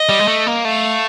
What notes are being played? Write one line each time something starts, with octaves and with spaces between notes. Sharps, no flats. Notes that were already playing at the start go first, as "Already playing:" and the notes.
Already playing: D#5
G3
G#3
A3
A#3
A3 F5